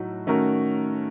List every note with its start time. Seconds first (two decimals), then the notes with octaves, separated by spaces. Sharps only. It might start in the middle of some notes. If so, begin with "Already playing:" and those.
Already playing: A2 F#3 A3 D#4 F#4
0.27 D#3 A3 C#4 F#4 A#4